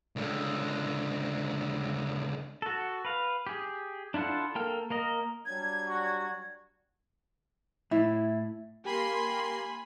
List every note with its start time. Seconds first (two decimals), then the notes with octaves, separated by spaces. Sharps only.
0.16 C#2 D3
2.62 F#4 A4
3.05 B4 F5
3.47 G4 G#4
4.14 D4 E4 F4 A4 F#5
4.55 A#3 A4 G5 F6
4.90 A#3 A#4 D#5
5.46 F#3 G3 D4 G#6
5.88 F#4
7.91 A2 E4
8.85 A#3 G4 G#5 B5 C6 C7